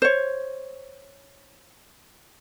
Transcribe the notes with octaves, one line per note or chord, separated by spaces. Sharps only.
C5 C#5